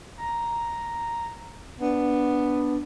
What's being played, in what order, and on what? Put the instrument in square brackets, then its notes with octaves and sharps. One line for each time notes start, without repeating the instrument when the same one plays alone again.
[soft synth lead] A#5
[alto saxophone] B3 [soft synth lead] D4